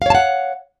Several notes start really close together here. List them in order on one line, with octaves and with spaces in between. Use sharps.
F5 C#5 A5 F#5